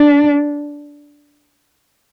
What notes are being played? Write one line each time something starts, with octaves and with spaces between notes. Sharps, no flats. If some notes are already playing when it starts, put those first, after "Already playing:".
Already playing: D4